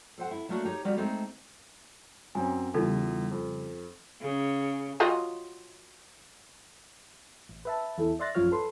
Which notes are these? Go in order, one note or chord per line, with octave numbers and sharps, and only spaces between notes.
A4 C5 F#5
E4
F#3 A3 A#3 D4 F#4
D#4 G4 C#5
G3 B3 F#4 G4 A#4
G#3 A3 C4 D#4
F#2 F#3 C4 G#5
E2 C#3 G3 D#4 F4 A4
F2
C#3
F#3 F4 D#5
A1
B4 E5 A5
E2 E4 A4
D5 E5 C6 F#6 A6 A#6
A1 F#2 F3 F4 C#5 F6
A4 B4 C6